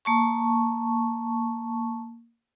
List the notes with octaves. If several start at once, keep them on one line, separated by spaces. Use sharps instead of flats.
A#3 A5 C#6